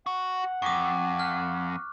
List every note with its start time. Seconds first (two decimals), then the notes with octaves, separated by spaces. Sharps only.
0.06 F#4 F#5
0.62 F2 C#6 D6
1.19 F6 F#6